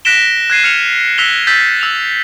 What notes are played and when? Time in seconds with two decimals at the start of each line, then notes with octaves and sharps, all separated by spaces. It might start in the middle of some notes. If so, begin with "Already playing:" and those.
0.05 F#6 A#6 B6 D7 E7 G7
0.50 F#6 G#6 C7 D#7
0.64 F6 C#7 F7
1.18 E6 F#6 A#6 B6 F7 G7
1.47 E6 G6 A6 B6
1.81 E6 F7